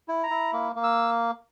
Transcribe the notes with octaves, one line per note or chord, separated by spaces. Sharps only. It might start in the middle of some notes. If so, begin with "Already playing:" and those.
E4
A#5
E4
A#3
A#3
E6